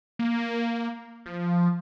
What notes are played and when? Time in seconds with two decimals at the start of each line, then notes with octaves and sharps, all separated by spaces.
0.19 A#3
1.26 F3